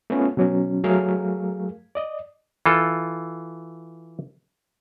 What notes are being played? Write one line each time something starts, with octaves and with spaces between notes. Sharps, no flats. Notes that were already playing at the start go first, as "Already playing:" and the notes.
A3 B3 C#4 F4
B2 F#3 C#4
F#3 A3 G#4 A#4 F5
D5 D#5
E3 F4 A4